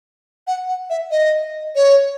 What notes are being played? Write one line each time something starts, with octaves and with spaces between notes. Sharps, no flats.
F#5
F#5
E5
D#5
C#5